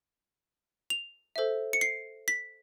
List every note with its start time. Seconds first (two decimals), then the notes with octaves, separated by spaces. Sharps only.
0.90 F7
1.36 A4 C5 E5
1.73 C#7
1.81 C7
2.28 B6